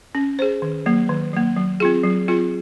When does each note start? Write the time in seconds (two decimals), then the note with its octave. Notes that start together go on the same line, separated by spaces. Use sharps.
0.15 C#4
0.39 G#4 C5
0.62 D#3
0.86 F#3 A#3
1.09 D#3
1.33 F#3 A#3
1.57 F#3
1.80 C4 F4 G#4
2.04 F#3
2.28 C4 F4 G#4